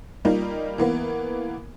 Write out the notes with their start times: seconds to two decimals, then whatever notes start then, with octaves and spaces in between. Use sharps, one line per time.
0.25 G3 A#3 D#4 F4
0.78 E3 A#3 B3